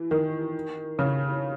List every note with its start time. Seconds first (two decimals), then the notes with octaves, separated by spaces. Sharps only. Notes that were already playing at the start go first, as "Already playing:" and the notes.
Already playing: E3
0.11 D#3
0.99 C#3